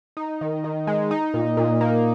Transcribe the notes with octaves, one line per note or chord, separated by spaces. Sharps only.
D#4
D#3
D#3
G#3
D#4
A#2
A#2
A#3